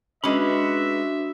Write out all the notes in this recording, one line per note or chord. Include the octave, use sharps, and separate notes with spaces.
G#3 C#4 D4 F#4 B4 E5 B5